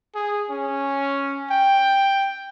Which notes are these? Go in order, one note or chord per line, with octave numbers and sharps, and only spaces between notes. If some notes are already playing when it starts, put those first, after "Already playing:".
G#4
C#4
G5